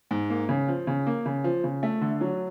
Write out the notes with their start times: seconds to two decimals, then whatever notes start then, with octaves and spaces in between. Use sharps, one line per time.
0.11 G#2
0.30 A#3
0.49 C#3
0.68 F3
0.87 C#3
1.07 A#3
1.26 C#3
1.44 F3
1.64 C#3
1.83 A3
2.01 D3
2.21 F#3